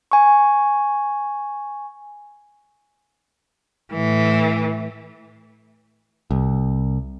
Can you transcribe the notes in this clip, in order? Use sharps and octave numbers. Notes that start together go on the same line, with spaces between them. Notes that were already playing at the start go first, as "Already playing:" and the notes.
G#5 C#6
A2 E3
C2